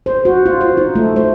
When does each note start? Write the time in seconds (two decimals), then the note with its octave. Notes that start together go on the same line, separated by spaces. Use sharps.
0.06 C5
0.25 F#4
0.46 F4
0.61 C5
0.77 D#4
0.95 A3
1.16 C5